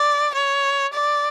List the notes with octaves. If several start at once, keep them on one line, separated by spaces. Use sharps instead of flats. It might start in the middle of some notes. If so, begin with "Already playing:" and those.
Already playing: D5
C#5
D5